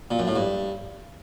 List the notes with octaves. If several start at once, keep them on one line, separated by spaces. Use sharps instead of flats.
A#2
F#2
A2
G2